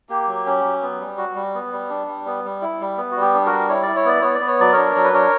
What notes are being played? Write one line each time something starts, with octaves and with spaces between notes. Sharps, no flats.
A#3 G4
F#3
C#4
F#3
B3
G3
F#4
G3
B3
G3
D4
G3
B3
G3
E4
G3
B3
G3 F#4
G4
D4
F#4 A#4
G3
E4 C#5
E4 D5
C#5
B3 D5
B3 C#5
D5
B3
C#5
F#3 D5
D4 A#4 C#5
F#3
B4
D4 A#4 C#5